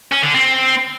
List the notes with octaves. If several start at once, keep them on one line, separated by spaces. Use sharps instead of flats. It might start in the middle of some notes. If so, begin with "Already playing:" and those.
C#4
D3
C4